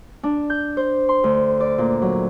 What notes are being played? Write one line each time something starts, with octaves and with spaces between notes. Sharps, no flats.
D4
G6
C5
C6
D2
D5
A#2
F#3